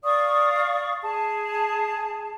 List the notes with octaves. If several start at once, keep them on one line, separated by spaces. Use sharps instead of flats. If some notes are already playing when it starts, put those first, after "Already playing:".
D5 F5 C#6 D#6
G#4 A5